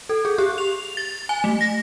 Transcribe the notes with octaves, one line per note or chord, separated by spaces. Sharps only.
A4
G#4
G4
F7
A6
G#5
A3
A#6